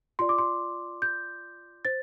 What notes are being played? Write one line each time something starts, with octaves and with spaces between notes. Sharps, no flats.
F4 D5 C6
D6
C6
G6
C5 A6